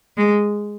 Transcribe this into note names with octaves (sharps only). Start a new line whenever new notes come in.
G#3